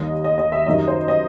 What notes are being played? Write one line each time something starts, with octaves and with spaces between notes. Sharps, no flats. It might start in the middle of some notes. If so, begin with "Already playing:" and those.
Already playing: D#2 D#3 G3 D#5
D#5
D#5
E5
F#2 D#3 G3 D#5
C5
D#5